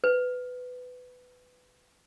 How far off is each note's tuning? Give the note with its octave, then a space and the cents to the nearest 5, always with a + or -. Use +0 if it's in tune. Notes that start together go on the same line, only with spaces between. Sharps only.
B4 +15